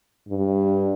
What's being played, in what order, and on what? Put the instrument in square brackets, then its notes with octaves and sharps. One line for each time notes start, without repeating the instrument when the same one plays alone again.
[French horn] G2